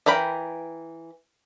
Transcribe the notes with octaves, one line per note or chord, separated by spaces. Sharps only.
E3 A#4 G5 B5